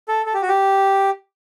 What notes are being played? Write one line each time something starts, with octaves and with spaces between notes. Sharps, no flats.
A4
A4
G4
F#4
G4